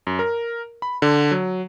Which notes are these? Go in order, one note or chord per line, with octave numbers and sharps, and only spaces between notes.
F#2
A#4
B5
D3
F#3